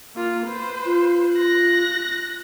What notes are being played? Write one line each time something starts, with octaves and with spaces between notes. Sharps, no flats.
A#3 F4
B4 C5
F4
F#6 A#6